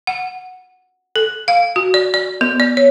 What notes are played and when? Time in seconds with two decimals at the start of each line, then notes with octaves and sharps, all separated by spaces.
0.07 F#5
1.16 A4
1.48 F5
1.76 F#4
1.94 D5
2.14 D5
2.41 B3
2.60 D5
2.77 C#5